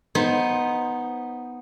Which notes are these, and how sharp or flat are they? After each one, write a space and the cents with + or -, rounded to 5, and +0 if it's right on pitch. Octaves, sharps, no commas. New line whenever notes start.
B3 +0 D#4 +0 C5 +10